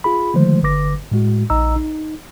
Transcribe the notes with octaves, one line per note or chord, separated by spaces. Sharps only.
F4 G#4 B5
D3 D#3 F3 G#3 A3 C5
G1 D3 B4 D6 A#6
A2 G#3 F#4
A#1 D#4 D#5 A#5 E6
D#4